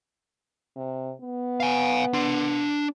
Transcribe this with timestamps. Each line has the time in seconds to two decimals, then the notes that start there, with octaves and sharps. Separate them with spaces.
0.76 C3
1.21 B3
1.60 F5 G#5
2.14 D4 C6